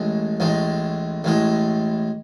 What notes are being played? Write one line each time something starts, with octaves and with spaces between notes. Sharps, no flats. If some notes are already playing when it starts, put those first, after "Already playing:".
Already playing: A1 A2 G#3
A1 A2 G#3
A1 A2 G#3